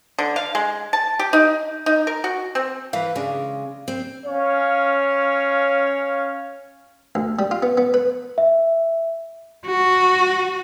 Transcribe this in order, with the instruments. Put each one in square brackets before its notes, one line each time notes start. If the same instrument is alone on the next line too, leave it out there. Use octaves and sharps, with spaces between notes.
[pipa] D3
F5
G#3
A5
G4
D#4
D#4
A#4
F#4
C4
[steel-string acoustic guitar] E3 [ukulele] B4 F5
[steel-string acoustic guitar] C#3 G#3 [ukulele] D4
[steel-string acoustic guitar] C4
[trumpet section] C#4 C#5 F5
[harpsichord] D2
G3
F4
B3
B3
B4
[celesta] E5
[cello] F#4